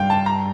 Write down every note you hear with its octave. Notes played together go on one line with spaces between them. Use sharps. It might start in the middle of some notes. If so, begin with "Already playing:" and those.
Already playing: G2 F5 G5
A5
A#5